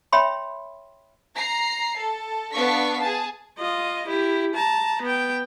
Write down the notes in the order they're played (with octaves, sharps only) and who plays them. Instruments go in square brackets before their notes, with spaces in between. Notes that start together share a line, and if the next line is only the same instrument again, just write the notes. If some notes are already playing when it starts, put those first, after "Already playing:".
[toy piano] C#5 E5 G5 B5 C6
[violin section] A#5 C7
A4
B3 D4 F5 C#6 B6
G#4 A5
[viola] F4 D#5
E4 G4
A5 A#5
B3 G5